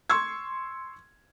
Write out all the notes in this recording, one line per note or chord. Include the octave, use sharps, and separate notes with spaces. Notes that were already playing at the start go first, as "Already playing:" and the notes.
C6 C#6 E6 G#6